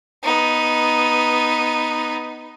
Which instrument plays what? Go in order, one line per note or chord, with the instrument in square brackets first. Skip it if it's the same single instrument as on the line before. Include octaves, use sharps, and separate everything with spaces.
[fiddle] B3 D#4